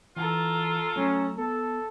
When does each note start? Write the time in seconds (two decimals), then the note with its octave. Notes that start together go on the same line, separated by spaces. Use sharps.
0.17 E3 F4 A4 A#5
0.96 F#3 A3 C#4
1.37 B3 A4